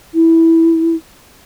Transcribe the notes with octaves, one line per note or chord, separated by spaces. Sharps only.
E4